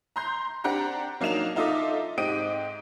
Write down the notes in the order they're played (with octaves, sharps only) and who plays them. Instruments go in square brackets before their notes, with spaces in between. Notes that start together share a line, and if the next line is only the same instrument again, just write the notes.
[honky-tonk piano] A#5 C6 G6
C4 D4 G4 F#5 A#5
F#3 A#3 D4 D#4 E7 F7
D#4 F4 A4 D#5 E5 D6
G#2 C4 G4 D#5 D7 D#7